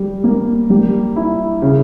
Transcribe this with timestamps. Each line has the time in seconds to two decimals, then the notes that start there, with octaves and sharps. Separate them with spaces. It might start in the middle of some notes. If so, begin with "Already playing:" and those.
Already playing: G3
0.24 A#3
0.70 G3
1.16 E4
1.62 C#3